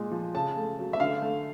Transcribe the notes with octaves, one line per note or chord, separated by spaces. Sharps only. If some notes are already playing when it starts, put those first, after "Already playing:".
Already playing: A#2 G#3
F3
C#3 A5
A3
F#3
E5
D3 F5
A3